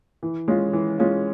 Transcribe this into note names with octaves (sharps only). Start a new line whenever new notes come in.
E3
G#3 C#4 F4
E3
G#3 C#4 F4